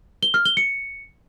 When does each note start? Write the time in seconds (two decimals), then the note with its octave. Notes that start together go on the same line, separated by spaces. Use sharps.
0.23 G7
0.34 F6
0.45 G7
0.57 C#7